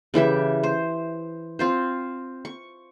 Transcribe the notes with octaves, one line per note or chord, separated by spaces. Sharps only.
C#3 E3 G4 E5
C5
C4 F4 C5
C#6